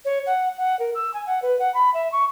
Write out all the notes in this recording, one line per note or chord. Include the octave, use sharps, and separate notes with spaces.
C#5
F#5
F#5
A#4
E6
G#5
F#5
B4
F#5
B5
E5
C#6